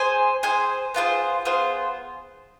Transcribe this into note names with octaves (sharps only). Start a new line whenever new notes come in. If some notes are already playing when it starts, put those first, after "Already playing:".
Already playing: G#4 C5 G#5
G#4 C5 G#5
B3 F4 G#4 C5
B3 F4 G#4 C5